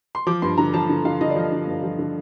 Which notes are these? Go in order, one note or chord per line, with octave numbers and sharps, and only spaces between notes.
C6
F3 D6
G2 C6
D3 A#5
F3 A5
D3
D3 F5
D3 D#5
D5
F3 D#5
D3
G2
F3
D3